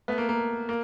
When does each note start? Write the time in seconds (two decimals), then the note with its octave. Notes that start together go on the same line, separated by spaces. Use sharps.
0.08 A3 B3
0.18 A#3
0.29 A#3
0.69 A#3